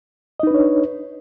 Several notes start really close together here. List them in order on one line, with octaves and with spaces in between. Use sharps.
D#5 D#4 B4 D4 C#5